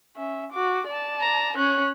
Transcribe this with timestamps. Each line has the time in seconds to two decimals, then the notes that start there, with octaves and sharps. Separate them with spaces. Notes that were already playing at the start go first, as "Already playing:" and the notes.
0.16 C#4 E5
0.52 F#4 D6
0.88 D5 A5
1.20 A#5
1.56 C#4 C#5 F#6